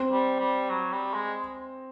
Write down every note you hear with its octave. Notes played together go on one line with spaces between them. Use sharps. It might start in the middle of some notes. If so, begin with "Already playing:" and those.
Already playing: C4
G3
G3
F#3
G3
G#3